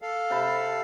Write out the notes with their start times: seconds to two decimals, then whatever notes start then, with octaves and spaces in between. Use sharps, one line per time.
0.02 A4 F5
0.30 C3 A5 B5